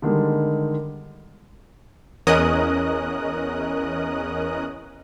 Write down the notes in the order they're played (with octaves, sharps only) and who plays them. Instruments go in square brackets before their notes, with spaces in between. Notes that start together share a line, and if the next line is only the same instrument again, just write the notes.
[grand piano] D3 D#3 G3 G#3
[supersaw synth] E2 C#4 A#4 D#5 D#6 F#6